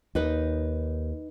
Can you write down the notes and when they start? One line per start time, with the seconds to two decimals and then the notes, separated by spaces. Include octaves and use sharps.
0.15 D#2 D#4 B4 D#5